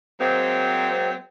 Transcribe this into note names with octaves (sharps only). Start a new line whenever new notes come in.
F#3 G#3 A#3 C4